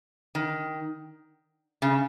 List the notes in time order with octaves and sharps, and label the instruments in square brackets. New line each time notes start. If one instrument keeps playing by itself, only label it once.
[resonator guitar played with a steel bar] D#3
C#3